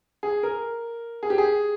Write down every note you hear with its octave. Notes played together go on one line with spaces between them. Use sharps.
G#4
A#4
G#4
G4
G#4